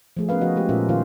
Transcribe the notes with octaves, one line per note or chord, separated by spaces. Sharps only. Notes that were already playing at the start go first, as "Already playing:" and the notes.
F3 A3 G#4
B3 C#4 A#4 B4 F5
F3 D#4 F#4 D#5
G#3 A3 G4 C5
A#2 C#4 F4 A#4 E5 F5
A#2 D#3 D#4 F4 C5 F5